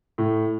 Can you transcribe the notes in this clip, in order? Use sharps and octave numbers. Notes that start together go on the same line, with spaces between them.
A2